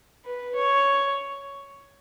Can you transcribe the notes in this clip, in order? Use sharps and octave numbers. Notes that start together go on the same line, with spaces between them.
B4
C#5